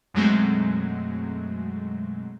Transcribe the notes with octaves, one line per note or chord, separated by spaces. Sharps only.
F#2 B2 F#3 G#3 A3 C4